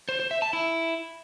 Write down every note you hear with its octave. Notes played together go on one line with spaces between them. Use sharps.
C5
C5
E5
A5
E4